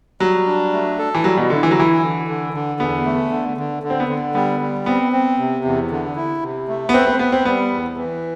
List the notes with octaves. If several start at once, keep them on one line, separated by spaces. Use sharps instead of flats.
F#3 G3
D4
A3
A4
E3
F#3 G3
B2
D3 E4
E3
F#3
E3 E4
D3
D3
D3
E2 B3
A3
D3
D3
D3
C4
B3
D3
G3 B3
G3
B3 C4
C4
C3
E2
D3
E4
C3
A3
B3
C4 B4
C4
B3 B4
C4
G3 B3
E2
E3